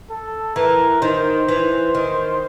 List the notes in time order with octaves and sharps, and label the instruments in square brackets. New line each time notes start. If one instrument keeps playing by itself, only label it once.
[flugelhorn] A4
[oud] E3 [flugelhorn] A#4
[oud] D#3 [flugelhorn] C5
[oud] E3
D#3